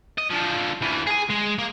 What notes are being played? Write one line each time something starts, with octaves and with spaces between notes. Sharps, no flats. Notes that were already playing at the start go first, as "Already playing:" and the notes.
D#5
D3 F3
D2 E3
G#4 G#5
G#3
A#3